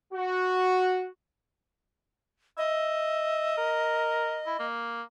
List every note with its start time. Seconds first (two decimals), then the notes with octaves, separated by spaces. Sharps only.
0.13 F#4
2.58 D#5 E5
3.57 A#4
4.46 E4
4.59 A#3